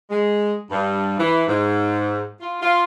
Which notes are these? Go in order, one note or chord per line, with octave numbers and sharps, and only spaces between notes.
G#3
G2
E3
G#2
F4
F4